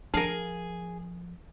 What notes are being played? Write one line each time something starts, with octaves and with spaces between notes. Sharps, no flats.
F3 D4 G#4 A#4 F5 D#7